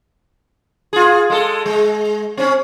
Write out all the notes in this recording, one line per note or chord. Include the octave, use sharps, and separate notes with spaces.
F4 G#4
G#3 A4
G#3
C4 C#4